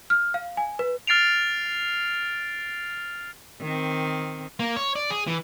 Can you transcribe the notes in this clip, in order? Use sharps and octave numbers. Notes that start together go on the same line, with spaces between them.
F6
F5
G#5
B4
F6 A6 C7 D7 F7
D#3 C4
A#3
C#5
D5
G#4
E3